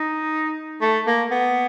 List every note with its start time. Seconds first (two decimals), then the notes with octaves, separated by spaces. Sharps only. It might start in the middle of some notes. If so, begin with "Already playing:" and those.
Already playing: D#4
0.81 A3
1.07 A#3
1.31 B3